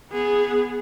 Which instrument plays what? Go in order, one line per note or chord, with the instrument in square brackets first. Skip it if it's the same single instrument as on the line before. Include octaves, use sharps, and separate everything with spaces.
[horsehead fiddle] B3 G#4